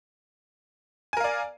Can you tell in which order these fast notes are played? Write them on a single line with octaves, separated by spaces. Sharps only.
G#5 A#4 F5 D5